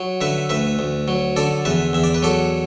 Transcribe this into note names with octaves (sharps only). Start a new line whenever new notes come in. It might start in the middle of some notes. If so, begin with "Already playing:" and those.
Already playing: F#3
D3 B4 E5
D2 B4 E5
D2
F#3
D3 A4 D5
E2 B4 E5
E2 E5
D5
B4
F#3 A4 D5